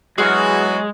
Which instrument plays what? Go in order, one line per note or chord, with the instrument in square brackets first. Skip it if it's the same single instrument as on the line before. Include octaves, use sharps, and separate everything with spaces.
[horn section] E3 B3 F#4 [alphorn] F#3 [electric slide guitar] G#3 [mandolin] G#4 C#6 F6